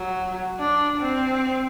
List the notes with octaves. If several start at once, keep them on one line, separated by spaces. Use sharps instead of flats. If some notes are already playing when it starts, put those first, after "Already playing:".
Already playing: F#3
D4
C4